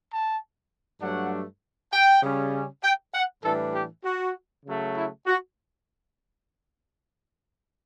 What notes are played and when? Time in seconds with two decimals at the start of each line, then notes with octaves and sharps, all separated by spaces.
0.11 A5
1.01 G2 F#3 A3 D4 F#5
1.93 G5
2.23 C#3 G3 C#4
2.83 G5
3.15 F#5
3.44 A2 E3 G3 D4 A4
3.74 G4
4.05 F#4
4.66 C#3 F#3 A3
4.96 E4
5.26 F#4